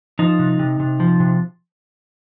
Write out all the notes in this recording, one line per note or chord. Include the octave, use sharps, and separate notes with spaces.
F3 D#4
C3
C3
C3
F3
C3